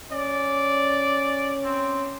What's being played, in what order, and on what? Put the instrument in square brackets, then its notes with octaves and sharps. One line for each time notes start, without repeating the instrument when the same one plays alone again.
[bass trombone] C#4 [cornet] D5
[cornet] C4